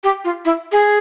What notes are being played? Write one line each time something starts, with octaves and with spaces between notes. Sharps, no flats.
G4
F4
E4
G#4